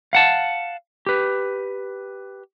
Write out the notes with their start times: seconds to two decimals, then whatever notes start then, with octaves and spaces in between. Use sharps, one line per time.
0.13 F5 F#5 A5
1.06 G4 B4